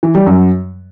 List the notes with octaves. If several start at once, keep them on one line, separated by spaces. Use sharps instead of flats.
E3
G3
F#2